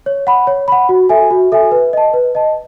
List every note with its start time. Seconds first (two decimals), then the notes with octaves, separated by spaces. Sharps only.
0.06 C#5
0.27 F#5 B5
0.47 C#5
0.68 F#5 B5
0.89 F#4
1.09 A4 E5 G#5
1.31 F#4
1.52 A4 E5 G#5
1.71 B4
1.93 D#5 A5
2.14 B4
2.35 D#5 A5